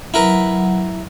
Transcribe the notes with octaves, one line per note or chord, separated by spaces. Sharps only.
F#3 E4 A#4 B4 F#5